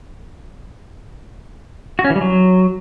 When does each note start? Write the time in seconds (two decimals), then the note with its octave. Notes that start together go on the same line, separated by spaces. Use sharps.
1.99 F#4
2.04 C#4
2.10 E3
2.16 G3
2.21 F#3